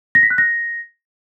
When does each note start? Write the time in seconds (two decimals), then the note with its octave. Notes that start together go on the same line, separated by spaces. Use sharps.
0.15 A#6
0.23 B6
0.30 F#6
0.38 A#6